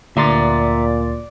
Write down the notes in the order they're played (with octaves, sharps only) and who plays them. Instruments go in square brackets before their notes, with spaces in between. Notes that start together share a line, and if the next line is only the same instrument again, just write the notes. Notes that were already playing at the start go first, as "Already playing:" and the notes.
[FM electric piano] D2 C6 A6 [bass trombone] A#2 [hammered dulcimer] D5 F#5 [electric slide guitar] E5 A#5